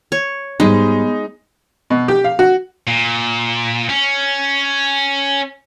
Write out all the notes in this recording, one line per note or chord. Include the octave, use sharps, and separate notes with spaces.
C#5
G#2 G3 G#3 B3 D#4
B2
G4
F5
F#4
A#2
C#4